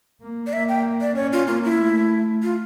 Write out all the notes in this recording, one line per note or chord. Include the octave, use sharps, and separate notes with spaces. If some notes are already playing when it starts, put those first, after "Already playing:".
A#3
D5
A#3 E5
G5
D5
C#4 C#5
F4
A#3 F4
E4
A3
F4